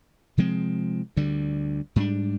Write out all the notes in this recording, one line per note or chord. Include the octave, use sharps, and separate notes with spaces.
C3 F3 G#3 C4
D2 D3 G3
G#2 G3 B3 D4